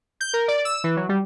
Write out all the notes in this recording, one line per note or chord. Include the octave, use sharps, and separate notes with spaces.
G6
A#4
D5
E6
E3
F#3
G3